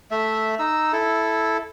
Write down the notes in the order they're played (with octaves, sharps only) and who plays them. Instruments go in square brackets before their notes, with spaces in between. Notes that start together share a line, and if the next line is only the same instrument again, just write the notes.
[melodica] A3 E5
D#4 E6
E4 A4